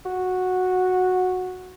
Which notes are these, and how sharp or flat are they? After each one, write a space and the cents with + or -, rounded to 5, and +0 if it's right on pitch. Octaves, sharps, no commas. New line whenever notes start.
F#4 -10